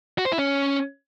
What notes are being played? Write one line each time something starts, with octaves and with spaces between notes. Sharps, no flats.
F#4
C5
E4
C#4